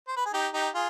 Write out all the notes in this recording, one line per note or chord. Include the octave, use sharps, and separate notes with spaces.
C5
B4
G#4
D#4 G4
D#4 G4
F4 G#4